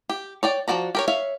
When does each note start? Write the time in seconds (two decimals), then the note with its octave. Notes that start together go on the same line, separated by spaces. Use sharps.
0.09 G4
0.43 C#5 D5 G5
0.68 F3 C4 F#4 D5 A#5
0.95 G4 A#4 C#5
1.08 C#5 E5 F5